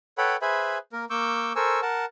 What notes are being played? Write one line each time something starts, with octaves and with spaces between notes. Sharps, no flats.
A4 B4 C#5 F#5 G5 B5
G#4 B4 C5 E5 G#5 B5
A#3 A#4
A#3 C#6 D6 E6 G6
A4 A#4 C5 G#5 C#6 E6
A#4 F#5 A5